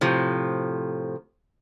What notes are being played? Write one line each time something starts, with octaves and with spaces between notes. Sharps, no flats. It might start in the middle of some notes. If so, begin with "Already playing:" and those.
A2 C3 F3